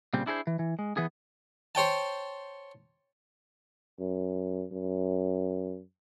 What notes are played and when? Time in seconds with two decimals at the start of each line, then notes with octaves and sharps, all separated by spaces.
0.13 A#2 C#3 G3 C4
0.26 D4 E4 G#4 A#4 C5
0.47 E3
0.59 E3
0.79 G#3
0.97 E3 B3 G#4
1.75 C5 C#5 G5 A5
4.00 F#2
4.72 F#2